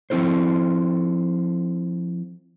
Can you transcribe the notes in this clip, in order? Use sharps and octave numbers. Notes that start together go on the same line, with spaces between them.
F3 C4 E4 A4 C5